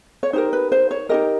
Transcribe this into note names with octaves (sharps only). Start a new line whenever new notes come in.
C#5
D#4 G4 A#4 C5
B4
C5
C#5
D#4 G4 A#4 D#5